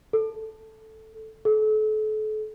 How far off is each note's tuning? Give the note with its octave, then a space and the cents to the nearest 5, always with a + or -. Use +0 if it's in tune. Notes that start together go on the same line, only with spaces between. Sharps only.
A4 +0
A4 -35